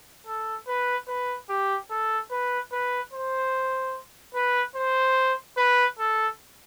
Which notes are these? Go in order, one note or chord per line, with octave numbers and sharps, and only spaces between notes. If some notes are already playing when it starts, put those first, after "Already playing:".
A4
B4
B4
G4
A4
B4
B4
C5
B4
C5
B4
A4